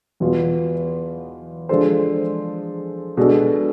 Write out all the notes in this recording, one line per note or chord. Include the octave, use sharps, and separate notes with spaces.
E2 B2 B3 F4
F3 G#3 D4 A4 C5
B2 G#3 D4 A4